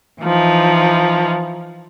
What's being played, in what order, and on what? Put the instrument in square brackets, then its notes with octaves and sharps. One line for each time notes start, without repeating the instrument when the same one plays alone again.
[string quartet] E3 F3 D#4